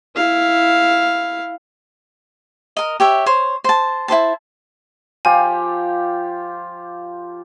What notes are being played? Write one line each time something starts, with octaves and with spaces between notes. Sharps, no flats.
E4 F5
A#4 D#5
G4 C#5 E5
C5 C#5
C5 A5
E4 G4 C5 A5
F3 F4 G4 G#5